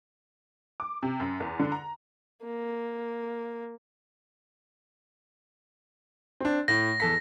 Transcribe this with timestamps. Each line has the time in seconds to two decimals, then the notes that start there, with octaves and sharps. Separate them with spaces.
0.80 D6
1.03 C3
1.20 F#2
1.40 E2
1.59 D3
1.72 A#5
2.44 A#3
6.40 C4 D4
6.68 A2 A#6
7.00 E2 A4 B6